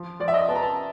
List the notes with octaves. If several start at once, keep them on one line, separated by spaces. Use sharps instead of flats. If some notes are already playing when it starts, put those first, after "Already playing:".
Already playing: F3
F3 D5
E5
D#5
B3 A5
A#5
A5